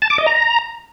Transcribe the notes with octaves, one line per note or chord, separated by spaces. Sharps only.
A5
D6
D#5
A#5